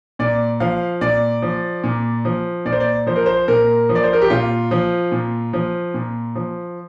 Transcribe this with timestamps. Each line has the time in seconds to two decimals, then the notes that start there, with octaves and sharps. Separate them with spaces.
0.19 A#2 D5
0.60 F3 F5
1.01 A#2 D5
1.42 F3
1.84 A#2
2.25 F3
2.65 A#2 D5
2.72 C5
2.80 D5
3.07 F3 C5
3.16 A#4
3.26 C5
3.48 A#2 A#4
3.89 F3
3.95 D5
4.04 C5
4.13 A#4
4.22 G4
4.30 A#2 F4
4.71 F3
5.12 A#2
5.53 F3
5.94 A#2
6.35 F3